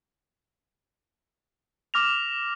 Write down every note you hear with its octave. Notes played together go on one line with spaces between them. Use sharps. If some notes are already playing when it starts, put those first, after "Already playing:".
D6 F6 A#6 F7